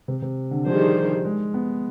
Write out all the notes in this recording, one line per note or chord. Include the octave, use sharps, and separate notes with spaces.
C3
C3
D3
D#3 F3 G3 D4 G#4 C5
G#3
B3